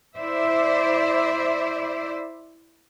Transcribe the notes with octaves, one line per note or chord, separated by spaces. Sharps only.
E4 C5 D5 E5